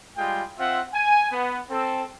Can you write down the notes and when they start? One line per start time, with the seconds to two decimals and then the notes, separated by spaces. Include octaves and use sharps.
0.17 G3 G#3 F4 G5
0.58 C4 F4 E5 F#5
0.93 G#5
1.32 B3
1.70 C4 A4